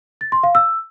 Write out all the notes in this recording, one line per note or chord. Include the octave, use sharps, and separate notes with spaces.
A6
C6
F5
E6